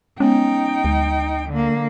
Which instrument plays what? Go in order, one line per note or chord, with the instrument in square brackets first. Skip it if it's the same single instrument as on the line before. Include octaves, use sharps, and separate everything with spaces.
[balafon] G#3 B3 [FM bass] C#4 [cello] D#4 G5
[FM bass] D2 [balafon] G#3
[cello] D3 A#3